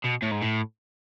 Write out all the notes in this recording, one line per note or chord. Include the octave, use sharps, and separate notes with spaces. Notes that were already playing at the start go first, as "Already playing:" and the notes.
B2
A2
G#2
A2